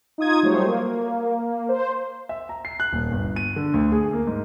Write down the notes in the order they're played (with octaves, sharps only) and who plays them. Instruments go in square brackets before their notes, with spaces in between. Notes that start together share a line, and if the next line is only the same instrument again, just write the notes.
[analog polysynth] D#4 F4 D#6 G#6
F#3 G3 A3 C5 C#5
A#3
C5
[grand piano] E5
A#5
C7
F#6
D#1
G1
D#7
D3
D2
G#4
A#3
G#2